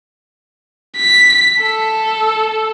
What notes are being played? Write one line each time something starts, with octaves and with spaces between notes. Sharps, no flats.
B6
A4